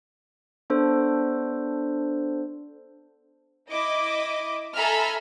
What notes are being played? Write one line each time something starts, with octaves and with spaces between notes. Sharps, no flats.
B3 D4 A4 C5
E4 D#5 D6
A4 E5 G#5 A#5 B5 F6